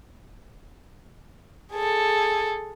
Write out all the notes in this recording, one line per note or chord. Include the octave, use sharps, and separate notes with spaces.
G#4 A4